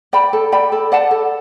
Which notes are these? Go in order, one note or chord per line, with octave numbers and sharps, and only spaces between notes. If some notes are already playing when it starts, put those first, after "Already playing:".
D5 G5 B5
A4
D5 G5 B5
A4
D5 F#5 A5
A4